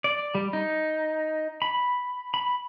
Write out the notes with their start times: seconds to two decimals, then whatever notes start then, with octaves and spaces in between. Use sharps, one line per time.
0.04 D5
0.35 G3
0.53 D#4
1.62 B5
2.34 B5